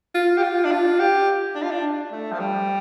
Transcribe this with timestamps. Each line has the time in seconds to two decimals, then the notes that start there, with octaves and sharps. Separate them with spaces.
0.15 F4
0.38 G4
0.43 F4
0.65 D4
0.71 F4
1.00 G4
1.55 D4
1.63 F4
1.71 D4
2.12 A3
2.32 F3
2.40 G3